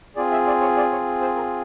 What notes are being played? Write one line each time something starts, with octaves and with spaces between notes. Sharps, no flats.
C4 F4 G#4 D5
E5
D5
C#5
D5
C#5
C5
A#4